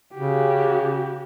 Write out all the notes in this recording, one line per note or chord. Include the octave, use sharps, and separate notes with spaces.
C#3 F#4 G4